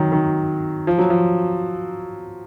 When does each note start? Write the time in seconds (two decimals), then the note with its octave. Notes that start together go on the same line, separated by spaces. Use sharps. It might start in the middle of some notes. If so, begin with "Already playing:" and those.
Already playing: D#3 F#3
0.12 D#3
0.87 F3
0.98 F#3
1.10 F3